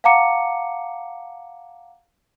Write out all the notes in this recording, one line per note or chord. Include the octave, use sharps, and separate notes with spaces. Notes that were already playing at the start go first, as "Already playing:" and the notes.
F5 F#5 A5 A#5 D6 C#7